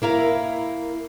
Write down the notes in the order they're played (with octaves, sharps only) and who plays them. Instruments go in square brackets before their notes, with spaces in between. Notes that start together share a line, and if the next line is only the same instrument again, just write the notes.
[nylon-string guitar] A#3 E4 A#4 F5